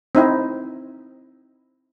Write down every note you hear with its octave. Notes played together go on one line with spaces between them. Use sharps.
C4 D#4 E4